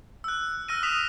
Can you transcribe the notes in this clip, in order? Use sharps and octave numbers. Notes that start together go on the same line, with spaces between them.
E6 F#6
E6 F6 A#6 D#7
D#6 B6 E7 F7